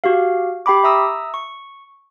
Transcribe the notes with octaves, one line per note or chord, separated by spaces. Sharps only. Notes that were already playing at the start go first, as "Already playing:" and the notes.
F#4 G4 F5
G4 G5 B5 D6
E5 A#5 D#6 E6
C#6